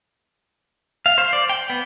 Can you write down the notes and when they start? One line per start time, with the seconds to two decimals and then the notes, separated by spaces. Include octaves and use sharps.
1.06 F5
1.18 C5
1.33 D5
1.49 G5
1.70 B3